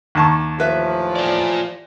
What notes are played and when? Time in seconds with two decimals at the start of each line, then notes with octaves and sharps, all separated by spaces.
0.15 D#2 A5 C#6
0.59 A2 E3 F3 G4 B4 E5
1.16 F4 D5